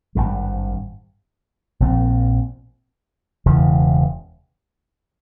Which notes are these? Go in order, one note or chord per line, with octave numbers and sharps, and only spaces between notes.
G#1 G2 G3
A#1 A#2 F3 C4
E1 E2 C#3 E3